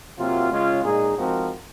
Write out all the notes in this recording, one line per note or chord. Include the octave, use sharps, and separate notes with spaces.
C3 F#3 A#3 F4
C#3 G#3 C#4 F4
A#2 G#3 D#4 G#4
G#2 F3 C4 F#4 A#4